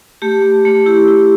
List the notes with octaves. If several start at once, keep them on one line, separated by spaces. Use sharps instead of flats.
A3 G4
A3
A3
E4 G4
E4